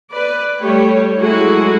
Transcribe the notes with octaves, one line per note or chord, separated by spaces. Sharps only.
B4 D5
G3 A3 G4 C#5
F#3 G#3 A3 E4 F#4 G#4